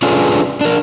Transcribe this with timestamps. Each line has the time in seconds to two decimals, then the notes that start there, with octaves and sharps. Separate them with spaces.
0.02 C#4 D4 F4 G#4 A4 B4
0.61 D4 A#4